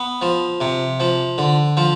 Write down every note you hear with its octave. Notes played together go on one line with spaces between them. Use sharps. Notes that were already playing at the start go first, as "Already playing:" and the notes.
Already playing: B3
F3
C3
F3
D3
F3